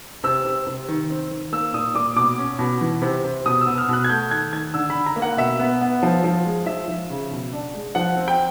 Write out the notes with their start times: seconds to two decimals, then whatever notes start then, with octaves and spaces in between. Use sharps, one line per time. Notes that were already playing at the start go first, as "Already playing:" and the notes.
0.24 C3 E6
0.45 C3
0.67 C3
0.88 D#3
1.10 C4
1.31 D#3
1.52 A#3 E6
1.74 A#2 D#6
1.94 A#2 D6
2.16 B2 D6
2.38 C#4
2.59 B2
2.81 E3
3.02 C3
3.24 C3
3.46 B2 D#6
3.61 E6
3.67 B3
3.78 F6
3.89 B2 F#6
4.04 G#6
4.09 A3 G6
4.30 D#3 G#6
4.52 D#3 G#6
4.74 D3 E6
4.90 B5
4.95 D3
5.06 A#5
5.16 A#3
5.22 F#5
5.38 B2 E5
5.60 B3
5.81 B3
6.03 F3
6.24 F3
6.45 G#3
6.66 F3 E5
6.88 F3
7.10 C#3
7.31 B2
7.53 D4
7.75 G#3
7.95 F3 F#5
8.16 C4
8.28 G5